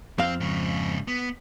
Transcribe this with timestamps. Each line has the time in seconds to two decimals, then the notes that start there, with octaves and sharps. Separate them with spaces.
0.18 F2 C4 F5
0.40 G#2 C#3
1.08 B3